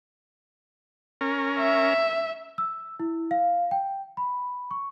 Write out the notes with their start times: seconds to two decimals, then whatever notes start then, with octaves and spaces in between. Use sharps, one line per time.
1.21 C#4 A#4
1.59 E5
2.58 E6
3.00 E4
3.31 F5
3.71 G5
4.17 B5
4.71 C#6